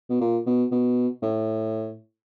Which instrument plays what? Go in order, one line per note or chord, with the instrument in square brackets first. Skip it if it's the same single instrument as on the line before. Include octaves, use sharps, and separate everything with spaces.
[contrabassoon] B2
A#2
B2
B2
A2